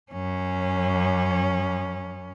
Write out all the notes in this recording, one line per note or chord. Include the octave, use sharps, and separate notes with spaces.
F#2 C#4